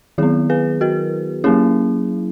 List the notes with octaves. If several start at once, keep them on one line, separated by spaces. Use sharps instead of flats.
D#3 F#3 B3 E4 G#4
G#4 B4
F#4 A#4
F#3 A#3 C#4 E4 G#4